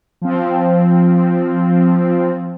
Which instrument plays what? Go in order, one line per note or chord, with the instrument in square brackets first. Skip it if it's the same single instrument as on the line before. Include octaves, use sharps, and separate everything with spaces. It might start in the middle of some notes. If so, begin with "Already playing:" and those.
[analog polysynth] F3 C4